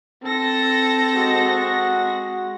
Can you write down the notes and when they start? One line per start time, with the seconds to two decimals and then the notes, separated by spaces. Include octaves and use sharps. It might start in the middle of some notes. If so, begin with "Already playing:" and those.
0.23 C4 A4 A#6
1.14 G#3 F#4